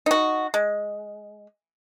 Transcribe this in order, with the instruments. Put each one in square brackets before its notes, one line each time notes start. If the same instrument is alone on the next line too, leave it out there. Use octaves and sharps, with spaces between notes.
[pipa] D#4 F#4
G#3